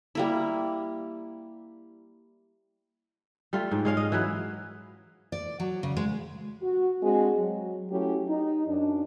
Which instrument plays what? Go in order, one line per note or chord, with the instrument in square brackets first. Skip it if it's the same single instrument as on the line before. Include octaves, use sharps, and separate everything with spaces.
[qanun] G3 A#3 E4
[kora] G3 A3 F4
G#2
G#3 C#4 F5
D#5
E3 F#3 B4
[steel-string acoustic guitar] D5
F#3
C#3
G#3
[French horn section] F#4
G#3 C4 D4 F#4 G#4
F#3
F#3 A3 C#4 E4 G4
D#4
F#2 D4